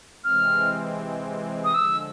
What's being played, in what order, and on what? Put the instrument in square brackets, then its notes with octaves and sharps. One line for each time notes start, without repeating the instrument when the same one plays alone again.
[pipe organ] C3 E3 G#3 C4 [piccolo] F6
[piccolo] D#6
[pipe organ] D3 F3 G#3 [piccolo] E6